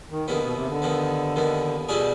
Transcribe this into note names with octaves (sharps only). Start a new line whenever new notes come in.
D#3
D#2 D3 D#3 B3
B2
C3
D3
D#2 D#3 B3
D#2 D#3 B3
B2 D3 G3 D4 F4 G#4